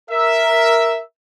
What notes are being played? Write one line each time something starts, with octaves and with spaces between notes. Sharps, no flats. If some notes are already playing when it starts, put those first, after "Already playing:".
A#4 E5